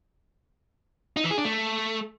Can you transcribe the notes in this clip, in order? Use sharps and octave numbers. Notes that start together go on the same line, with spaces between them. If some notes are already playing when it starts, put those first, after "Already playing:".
D#4
E3
G#4
D4
A3